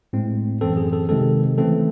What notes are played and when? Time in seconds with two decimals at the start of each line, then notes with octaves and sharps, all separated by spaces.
0.13 A2 G#3 C4
0.61 F#2 E3 C4 A4
0.77 G#4
0.93 A4
1.09 C3 D#3 G#3 C4 A4
1.58 C#3 E3 A3 C4 A4